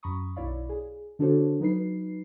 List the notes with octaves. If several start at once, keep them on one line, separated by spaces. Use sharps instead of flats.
F#2 A#5 B5 C#6 D#6
B1 E4 C#5 D5 F5 B5
G#4
D3 D4 F#4 A4 C5 C#5
F#3 D#4 B4 C7